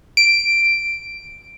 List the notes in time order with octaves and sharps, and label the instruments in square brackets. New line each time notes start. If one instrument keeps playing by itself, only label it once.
[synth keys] D7